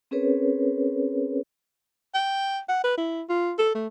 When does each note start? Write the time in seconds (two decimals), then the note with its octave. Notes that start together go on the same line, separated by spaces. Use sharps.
0.11 C4 C#4 G#4 A#4 B4 C#5
2.14 G5
2.69 F#5
2.84 B4
2.98 E4
3.29 F4
3.58 A4
3.75 A3